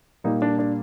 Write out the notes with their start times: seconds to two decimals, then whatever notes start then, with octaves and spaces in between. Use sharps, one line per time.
0.24 A#2 G3 A#3 D#4
0.42 D4
0.59 D4